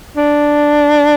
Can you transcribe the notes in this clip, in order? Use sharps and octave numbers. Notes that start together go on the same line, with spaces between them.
D4